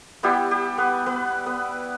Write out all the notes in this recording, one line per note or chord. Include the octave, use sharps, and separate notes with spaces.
G3 B3 E4 G4
G4
B3 B4
B3 B4
B3 B4